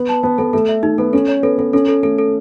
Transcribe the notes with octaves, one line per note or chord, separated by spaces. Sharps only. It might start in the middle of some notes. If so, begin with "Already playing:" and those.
Already playing: B3
A5
B3 A5
B3 A4
A3 A4
E5
A3 D#4
B3 A4
C#4 A4
C#5
B3 A4
B3 A4
C#4 A4
A4
A3 A4
A4